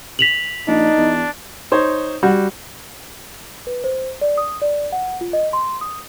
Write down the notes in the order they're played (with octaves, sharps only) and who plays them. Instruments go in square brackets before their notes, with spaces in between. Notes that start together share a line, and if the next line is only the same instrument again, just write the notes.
[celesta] B6 F7 F#7
[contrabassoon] A#1 [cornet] D4 [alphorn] D#4
[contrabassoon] E2
[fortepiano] D#4 C5 C#5
G3 F#4
[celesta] B4
C5
D5
D#6
D5
F#5
F4
D#5
C6
D#6